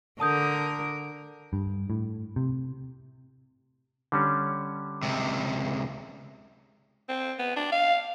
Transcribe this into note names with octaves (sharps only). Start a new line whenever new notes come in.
D3 A#4 A5 D#6 G6
G2
A2
C3
D3 G3 C#4
C#2 C3
C4
B3
D4
F5